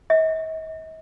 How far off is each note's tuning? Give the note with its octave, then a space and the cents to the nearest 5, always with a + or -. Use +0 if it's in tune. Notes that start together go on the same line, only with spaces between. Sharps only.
D#5 +45